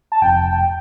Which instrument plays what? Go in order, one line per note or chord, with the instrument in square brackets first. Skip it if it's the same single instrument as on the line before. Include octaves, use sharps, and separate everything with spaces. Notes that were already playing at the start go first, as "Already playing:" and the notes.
[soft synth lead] A5
[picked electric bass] F1 [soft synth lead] G5